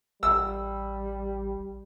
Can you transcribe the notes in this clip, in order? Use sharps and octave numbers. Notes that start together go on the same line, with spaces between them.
A1 G3 E6